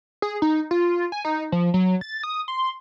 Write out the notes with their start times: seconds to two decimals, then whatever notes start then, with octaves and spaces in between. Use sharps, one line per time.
0.22 G#4
0.42 D#4
0.71 F4
1.12 G#5
1.25 D#4
1.52 F3
1.74 F#3
2.01 A6
2.23 D#6
2.48 C6